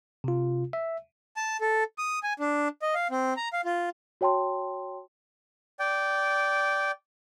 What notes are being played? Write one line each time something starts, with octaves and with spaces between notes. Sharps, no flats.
C3 F4
E5
A5
A4
D#6
G#5
D4
D#5
F5
C4
A#5
F5
F4
F#4 C#5 G5 A5 C6
D5 G5